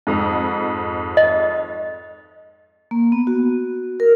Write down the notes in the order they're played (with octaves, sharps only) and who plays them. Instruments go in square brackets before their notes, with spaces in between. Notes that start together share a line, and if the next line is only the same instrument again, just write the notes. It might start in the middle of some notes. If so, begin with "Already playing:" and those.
[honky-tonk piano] F2 G#2
[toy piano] D#5
[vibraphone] A#3
B3
F#4
A#4